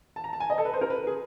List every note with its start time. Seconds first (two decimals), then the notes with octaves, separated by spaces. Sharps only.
0.16 A5
0.24 A#5
0.33 A5
0.40 G#5
0.50 D#5
0.58 A4
0.65 B4
0.74 C5
0.81 A#4
0.90 B4
1.07 G#4